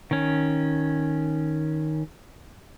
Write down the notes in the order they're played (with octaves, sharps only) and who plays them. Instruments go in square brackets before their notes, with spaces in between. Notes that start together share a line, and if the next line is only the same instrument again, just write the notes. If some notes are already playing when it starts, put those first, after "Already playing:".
[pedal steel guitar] D#3 C#4